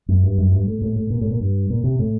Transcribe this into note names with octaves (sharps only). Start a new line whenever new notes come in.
F#2
G2
F#2
G2
A2
A2
A2
A#2
A2
A#2
G2
A#2
C3
A2